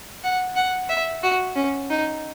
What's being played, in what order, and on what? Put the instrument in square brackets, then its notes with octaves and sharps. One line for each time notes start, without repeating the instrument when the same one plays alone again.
[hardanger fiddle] F#5
F#5
E5
F#4
C#4
D#4